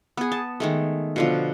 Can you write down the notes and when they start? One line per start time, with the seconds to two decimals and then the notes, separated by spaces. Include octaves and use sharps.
0.17 B3 G#4
0.32 A5
0.60 D#3 G#3 A3
1.16 B2 D3 F3